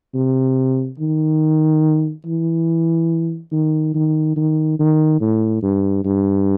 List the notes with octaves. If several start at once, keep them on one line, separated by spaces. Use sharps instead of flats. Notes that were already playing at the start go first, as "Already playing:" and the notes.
C3
D#3
E3
D#3
D#3
D#3
D#3
A2
G2
G2